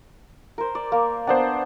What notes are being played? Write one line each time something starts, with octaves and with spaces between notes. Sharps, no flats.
A#4 C5
D5
A#3 A#4
B3 D4 C5 D5 F#5